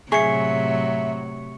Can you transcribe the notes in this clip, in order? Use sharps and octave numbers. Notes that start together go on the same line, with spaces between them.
A2 C3 F#3 G#4 E5 C#6 C#7